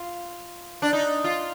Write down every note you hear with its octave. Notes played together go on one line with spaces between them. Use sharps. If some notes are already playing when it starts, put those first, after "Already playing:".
Already playing: F4
D4
D#4
F4